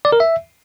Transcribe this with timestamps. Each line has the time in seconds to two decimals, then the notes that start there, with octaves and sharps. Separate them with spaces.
0.05 D5
0.12 A#4
0.20 E5